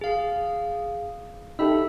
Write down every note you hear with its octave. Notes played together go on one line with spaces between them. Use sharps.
G#4 F5
D#4 G4 A4 E5 B5 E6